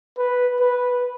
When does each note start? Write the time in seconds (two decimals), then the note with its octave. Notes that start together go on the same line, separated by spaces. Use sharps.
0.18 B4
0.60 B4